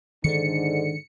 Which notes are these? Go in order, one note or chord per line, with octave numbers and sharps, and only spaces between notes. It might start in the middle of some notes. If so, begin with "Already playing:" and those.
G#2 D3 D#3 D4 C#7